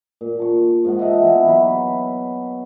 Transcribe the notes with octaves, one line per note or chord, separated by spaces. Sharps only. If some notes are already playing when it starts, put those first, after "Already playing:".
A#2
A5 C#6
G#2 F4 F#5
D#5 E5 F#5 A5
E3 B3
F#3 F#4 B5